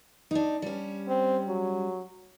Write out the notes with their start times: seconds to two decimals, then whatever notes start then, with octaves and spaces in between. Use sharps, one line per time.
0.31 D4 D#4
0.62 G3 C#4
1.08 C4
1.49 F#3